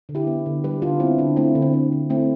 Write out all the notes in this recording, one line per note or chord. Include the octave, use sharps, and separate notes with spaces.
D3
E4 G4
B3
D3
G3 G4 B4
D3 D4 F4
B3 C4 E4
D3 D4
A3 C4 E4
D3
C4
C4
D3
A3 C4 E4